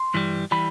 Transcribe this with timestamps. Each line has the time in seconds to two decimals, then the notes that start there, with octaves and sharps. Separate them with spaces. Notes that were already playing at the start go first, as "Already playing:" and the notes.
Already playing: C6
0.14 G2 E3 G3
0.51 E3 G3 B5